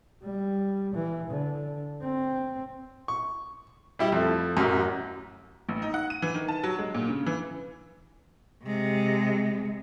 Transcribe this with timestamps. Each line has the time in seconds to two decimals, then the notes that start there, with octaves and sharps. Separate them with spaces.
0.22 G3
0.94 E3
1.30 D3
2.01 C4
3.08 C#6
3.99 G3 E4 G4
4.12 F2 A3
4.57 A1 F#2
5.69 A1
5.82 D#4
5.94 F#5
6.10 D#7
6.22 E3
6.35 D#3
6.48 A5
6.63 F#3
6.79 G#3
6.95 A#2
7.09 C#3
7.26 E3
8.63 C3 G#3